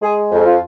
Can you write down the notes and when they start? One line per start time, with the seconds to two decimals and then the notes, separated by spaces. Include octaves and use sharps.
0.02 G#3 G#4
0.31 F2
0.46 F4